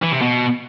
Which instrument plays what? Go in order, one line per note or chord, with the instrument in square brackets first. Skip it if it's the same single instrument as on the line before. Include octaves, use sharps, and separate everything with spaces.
[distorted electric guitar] E3
C3
B2